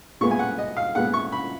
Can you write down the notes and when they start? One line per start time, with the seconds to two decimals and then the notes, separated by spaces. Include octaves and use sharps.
0.21 A#2 G#3 B3 C#6
0.31 G#5
0.39 F#5
0.58 D#5
0.77 F5
0.95 A#2 G#3 B3 F#5
1.14 C#6
1.32 B5